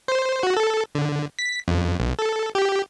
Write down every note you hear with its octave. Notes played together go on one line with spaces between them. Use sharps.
C5
F#4
A4
D3
B6
F2
B1
A4
G4